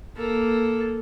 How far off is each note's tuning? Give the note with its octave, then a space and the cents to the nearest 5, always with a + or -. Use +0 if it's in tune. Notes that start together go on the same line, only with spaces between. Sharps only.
A#3 +0 A4 +0